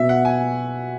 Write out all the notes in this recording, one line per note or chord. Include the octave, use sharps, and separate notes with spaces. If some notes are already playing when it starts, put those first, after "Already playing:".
Already playing: B2 B3 F#4 E5
F#5
G#5